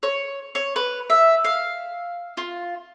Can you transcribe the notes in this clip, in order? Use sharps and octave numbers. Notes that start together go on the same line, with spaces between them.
C#5
C#5
B4
E5
F5
F4